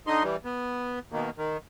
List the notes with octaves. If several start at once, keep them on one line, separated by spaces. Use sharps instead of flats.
D3 D#4 D#5 C6
E3 G3
B3
B2 D#3 A#3
D#3